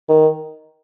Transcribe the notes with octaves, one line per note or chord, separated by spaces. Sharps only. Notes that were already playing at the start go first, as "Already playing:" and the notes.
D#3